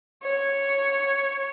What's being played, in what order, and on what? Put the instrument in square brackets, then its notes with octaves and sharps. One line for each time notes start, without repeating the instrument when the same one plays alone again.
[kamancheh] C#5